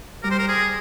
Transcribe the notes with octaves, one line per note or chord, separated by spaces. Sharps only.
G3 A#4
C5
A#4
G#4